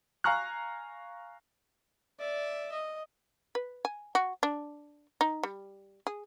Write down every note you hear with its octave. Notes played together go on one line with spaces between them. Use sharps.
F5 G#5 A#5 C#6 F6 F#6
D5 E5
D#5
B4
G#5
F#4
D4
D#4
G3
G#4